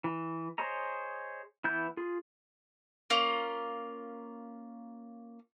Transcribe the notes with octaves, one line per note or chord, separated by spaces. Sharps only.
E3
G#4 C5 C#5 D#5 A#5
E3 B3 E4 G6
F4 G#4
A#3 C#4 F4